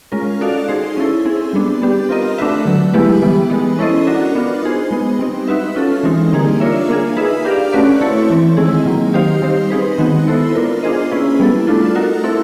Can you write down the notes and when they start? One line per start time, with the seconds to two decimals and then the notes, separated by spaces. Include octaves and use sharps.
0.12 G#3 C#4 F4 A#4
0.41 D#4 F#4 A4 D5 F5
0.68 D#4 G#4 C5
0.97 C#4 E4 A4
1.25 C4 E4 G#4
1.53 G3 B3 D4
1.82 B3 D4 G4
2.09 C4 F4 A#4 D#5
2.38 A3 D4 F#4 B4 E5
2.65 D3 F#3 A3
2.94 G#3 B3 E4 G4 B4
3.22 E3 G3 B3
3.50 G#3 B3 D#4
3.79 C#4 E4 A4 C5 D#5
4.07 D4 F#4 A#4
4.35 B3 D4 F4
4.63 D#4 G#4 C5
4.91 G#3 B3 D#4
5.19 G3 C4 D#4
5.48 D#4 F#4 B4 E5
5.76 C#4 F4 A4
6.03 E3 G#3 C4 D#4
6.33 D3 G3 A#3 D#4 G#4
6.60 D4 F4 A#4 C#5 E5
6.89 A#3 D4 F4 G#4
7.17 D#4 G#4 B4 E5
7.45 D4 G4 A#4 D5 F5
7.72 A3 C#4 F#4 B4 D5
8.01 A3 C4 E4 A4 C#5
8.30 E3 A3 C4
8.57 D#3 G#3 C4 E4 G#4
8.85 D#3 F#3 A#3
9.14 D#4 G4 C5 F5
9.42 G3 C4 D#4 G4 C5
9.70 C4 D#4 G#4 B4
9.98 D#3 G#3 B3 D#4 F#4
10.27 B3 E4 A4 C5
10.55 B3 D4 F4 A#4
10.83 D4 F4 G#4 C5 D#5
11.11 A#3 C#4 E4 G#4 B4
11.39 G3 B3 E4 A4
11.67 A3 D4 F4 A4
11.95 D#4 F#4 A#4
12.24 C4 E4 A4